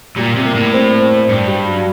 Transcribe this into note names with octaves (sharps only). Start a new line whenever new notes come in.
A#2 G3
C3
A#3
A2
C4
C4
G2
G3
F#3